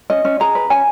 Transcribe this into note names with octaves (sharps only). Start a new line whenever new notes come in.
C#4 D#5
C#4
G#4 A#5
B4
C#4 G#5